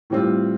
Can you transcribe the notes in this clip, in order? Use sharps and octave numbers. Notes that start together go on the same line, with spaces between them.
A2 E3 G3 C4 F4